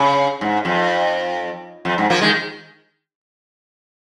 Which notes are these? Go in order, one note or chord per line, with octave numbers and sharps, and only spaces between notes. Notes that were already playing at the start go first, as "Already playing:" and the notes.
Already playing: C#3
G#2
F2
F2
G#2
F3 A#3
D#3 G#3